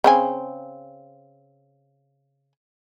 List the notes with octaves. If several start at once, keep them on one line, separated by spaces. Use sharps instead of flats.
C#3 C4 G#5